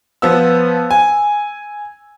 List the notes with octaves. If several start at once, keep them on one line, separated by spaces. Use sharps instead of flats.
F3 B3 E6
G#5